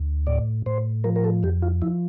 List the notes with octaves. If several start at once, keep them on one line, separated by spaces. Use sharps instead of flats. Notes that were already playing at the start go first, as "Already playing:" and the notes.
Already playing: D2
A2 D5
A2 C5
F3 A#4
A#4
A4
F2 G4
F4
F3 E4